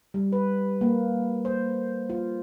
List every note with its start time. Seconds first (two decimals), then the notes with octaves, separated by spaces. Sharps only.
0.14 G3
0.32 B4
0.81 A#3
1.45 C5
2.10 F4